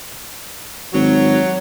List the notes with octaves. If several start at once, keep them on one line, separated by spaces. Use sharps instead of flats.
G#1 F#3